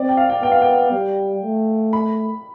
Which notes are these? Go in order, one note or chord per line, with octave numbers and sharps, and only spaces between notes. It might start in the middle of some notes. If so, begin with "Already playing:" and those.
Already playing: C4 D5
G5
F5
G5
B3 G5
F5
G5
G3
A3
B5